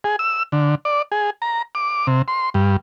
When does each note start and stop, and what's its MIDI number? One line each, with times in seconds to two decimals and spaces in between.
0.04 0.16 68
0.19 0.43 88
0.52 0.75 50
0.85 1.02 74
1.12 1.30 68
1.42 1.62 82
1.75 2.07 86
2.07 2.22 48
2.28 2.50 84
2.54 2.76 43